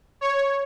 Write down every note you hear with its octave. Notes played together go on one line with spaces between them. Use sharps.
C#5